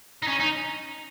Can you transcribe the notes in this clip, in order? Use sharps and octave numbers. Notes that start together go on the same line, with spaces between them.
D#4
C#4
D#4